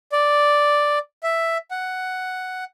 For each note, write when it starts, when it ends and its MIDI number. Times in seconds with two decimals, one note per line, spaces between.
0.12 0.99 74
1.23 1.57 76
1.71 2.64 78